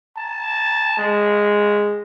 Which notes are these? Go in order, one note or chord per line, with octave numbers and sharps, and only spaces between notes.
A5
G#3